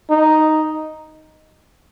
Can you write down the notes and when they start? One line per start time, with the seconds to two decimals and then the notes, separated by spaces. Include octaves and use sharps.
0.10 D#4